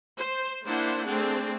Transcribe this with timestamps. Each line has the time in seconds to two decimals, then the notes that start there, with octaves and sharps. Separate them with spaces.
0.18 C5
0.65 A#3 D4 E4 C5 F#5
1.05 A3 C4 D4 G#4